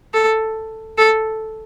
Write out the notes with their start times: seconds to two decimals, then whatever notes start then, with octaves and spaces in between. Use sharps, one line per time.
0.14 A4
0.98 A4